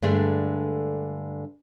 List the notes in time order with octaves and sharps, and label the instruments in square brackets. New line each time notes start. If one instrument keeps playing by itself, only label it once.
[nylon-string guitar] G2 D3 G#3 A3 D4